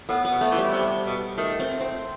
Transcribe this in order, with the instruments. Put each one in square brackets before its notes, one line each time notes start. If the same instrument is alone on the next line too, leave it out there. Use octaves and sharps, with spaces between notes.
[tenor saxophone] A2 [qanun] B3
[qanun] B3
[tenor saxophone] B2
[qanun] A3
[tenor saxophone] E3
[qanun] G3
[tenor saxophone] C3
B2
[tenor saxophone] D#3 [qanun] A3
[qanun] C4
C4